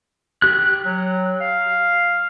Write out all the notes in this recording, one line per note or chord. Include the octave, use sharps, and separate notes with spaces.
G4 F#6
F#3
F5